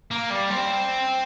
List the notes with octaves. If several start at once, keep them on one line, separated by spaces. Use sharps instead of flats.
A#3
G3
C4